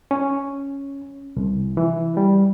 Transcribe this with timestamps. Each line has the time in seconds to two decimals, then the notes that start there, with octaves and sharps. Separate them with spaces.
0.11 C#4
1.36 C2
1.77 E3
2.17 G3